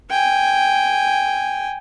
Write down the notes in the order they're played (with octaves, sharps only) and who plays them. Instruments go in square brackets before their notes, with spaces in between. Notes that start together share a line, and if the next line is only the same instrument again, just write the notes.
[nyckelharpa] G5 G#5